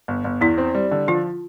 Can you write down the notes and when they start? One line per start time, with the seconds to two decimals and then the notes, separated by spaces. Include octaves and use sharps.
0.08 G1
0.24 G1
0.41 E2 E4
0.58 C4
0.74 G3
0.91 D3
1.07 F3 F4